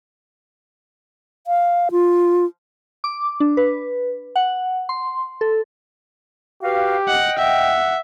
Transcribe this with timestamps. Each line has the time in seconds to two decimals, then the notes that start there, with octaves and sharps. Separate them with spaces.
1.47 F5
1.91 F4
3.04 D6
3.40 D4
3.57 B4
4.36 F#5
4.89 C6
5.41 A4
6.63 F#4 G4 B4 F5
7.08 D#5 F#5 G5
7.38 E5 F#5